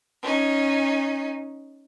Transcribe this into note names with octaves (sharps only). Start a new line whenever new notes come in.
C#4 D#4